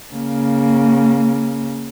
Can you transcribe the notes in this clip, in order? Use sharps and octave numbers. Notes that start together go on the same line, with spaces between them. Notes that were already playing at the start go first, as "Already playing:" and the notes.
C#3 A#3